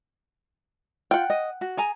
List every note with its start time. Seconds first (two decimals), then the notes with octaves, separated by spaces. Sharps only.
1.11 F4 F#5 G5
1.30 D#5
1.61 F#4
1.77 G#4 G#5 A#5